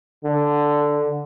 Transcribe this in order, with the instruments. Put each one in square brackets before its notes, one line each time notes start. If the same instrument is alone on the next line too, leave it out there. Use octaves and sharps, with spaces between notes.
[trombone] D3